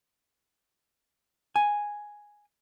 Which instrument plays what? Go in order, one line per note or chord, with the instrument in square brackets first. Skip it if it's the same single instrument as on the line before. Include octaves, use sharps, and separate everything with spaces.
[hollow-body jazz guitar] G#5